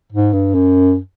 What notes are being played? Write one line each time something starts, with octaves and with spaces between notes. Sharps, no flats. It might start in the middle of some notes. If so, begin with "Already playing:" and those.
G#2
G2
F#2